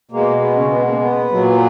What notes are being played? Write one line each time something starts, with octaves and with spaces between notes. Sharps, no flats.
B2 G#3 A#3
B3
C#3 C#4
B3
A#3
B3
A#2 F#3